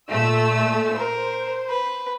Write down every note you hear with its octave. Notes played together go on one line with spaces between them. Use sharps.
A#2 A3 E6
A#4 C5
B4